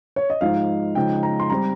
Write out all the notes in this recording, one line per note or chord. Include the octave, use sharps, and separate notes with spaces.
C#5
D#5
G#2 F3 G#3 D#4 F5
C#3 F3 G#3 D#4 G5
A#5
C6
G3 C4 A#5